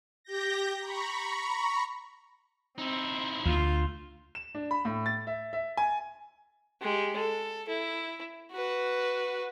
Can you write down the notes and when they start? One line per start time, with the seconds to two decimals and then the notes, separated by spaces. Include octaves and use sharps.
0.24 G4 G6 A#6
0.80 A#5 B5 C#6
2.78 C4 D#4 E4
3.46 D2 F4
4.35 E7
4.55 D4
4.71 B5
4.85 A2
5.06 A6
5.27 E5
5.53 E5
5.77 G#5
6.81 G#3 G4
7.16 A4
7.69 E4
8.53 F#4 B4